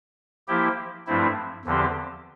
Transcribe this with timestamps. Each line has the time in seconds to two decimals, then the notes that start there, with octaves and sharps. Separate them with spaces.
0.48 F3 A#3 E4 G4
1.07 G2 F3 A3 C4 E4
1.65 E2 D3 F3 C4 G4